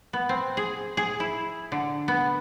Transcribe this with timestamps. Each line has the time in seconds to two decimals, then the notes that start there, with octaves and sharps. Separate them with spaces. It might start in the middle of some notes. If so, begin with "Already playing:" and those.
0.13 B3
0.29 C4
0.57 G#4
0.97 G#4
1.20 E4
1.72 D3
2.08 B3